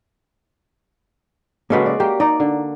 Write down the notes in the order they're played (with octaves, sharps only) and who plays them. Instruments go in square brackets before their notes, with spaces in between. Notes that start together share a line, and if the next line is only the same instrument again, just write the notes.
[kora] C#3 G#3 F#4 [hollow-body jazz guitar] A#3 A4 B4
[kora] D5
[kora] A#3 [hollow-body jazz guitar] G4
[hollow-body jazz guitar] D#4 A#5 [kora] D5
[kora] D3